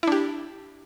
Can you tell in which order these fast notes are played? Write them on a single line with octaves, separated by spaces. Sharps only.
E4 D4 G4